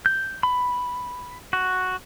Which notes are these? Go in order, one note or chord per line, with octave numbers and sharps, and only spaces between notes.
G6
B5
F#4